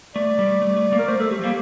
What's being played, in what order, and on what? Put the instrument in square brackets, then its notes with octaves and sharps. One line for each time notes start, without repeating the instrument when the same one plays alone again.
[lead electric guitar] A3 [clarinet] D5
[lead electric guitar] G3
A3
A3
A#3
[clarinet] A#4
[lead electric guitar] A3 [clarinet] C5
[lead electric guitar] A3 [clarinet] A4
[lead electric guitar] A3 [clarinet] G4
[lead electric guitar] F3
[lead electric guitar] G3 [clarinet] A#3